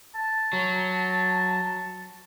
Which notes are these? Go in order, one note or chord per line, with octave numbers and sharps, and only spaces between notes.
A5
F#3